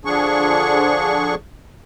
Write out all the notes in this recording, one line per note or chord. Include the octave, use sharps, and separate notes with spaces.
D3 F3 D4 G#4 C#6